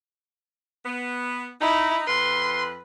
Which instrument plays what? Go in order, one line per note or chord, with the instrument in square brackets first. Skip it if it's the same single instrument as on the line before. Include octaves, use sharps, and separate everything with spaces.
[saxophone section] B3
[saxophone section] D#4 [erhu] E4
[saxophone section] F2 B4 [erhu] C6